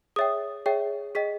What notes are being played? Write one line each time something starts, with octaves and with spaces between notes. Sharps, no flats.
G#4 C#5 E5 G5 D#6
G#4 C#5 E5 G5
G#4 D#5 G5 B6